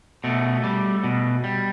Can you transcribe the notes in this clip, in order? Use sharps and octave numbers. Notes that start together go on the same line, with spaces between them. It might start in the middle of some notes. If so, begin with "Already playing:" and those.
B2 A3
G3
B2
G3